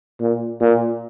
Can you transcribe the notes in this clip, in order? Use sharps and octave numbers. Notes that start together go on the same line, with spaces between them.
A#2
A#2